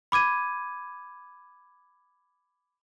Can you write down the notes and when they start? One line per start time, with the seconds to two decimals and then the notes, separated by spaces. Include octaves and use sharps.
0.12 B5 D6 G#6 D#7